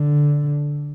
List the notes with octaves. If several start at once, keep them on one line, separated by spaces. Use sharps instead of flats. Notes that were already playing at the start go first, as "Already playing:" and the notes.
Already playing: D3